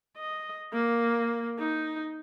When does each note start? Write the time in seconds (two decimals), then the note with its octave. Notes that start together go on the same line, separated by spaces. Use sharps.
0.17 D#5
0.73 A#3
1.59 D#4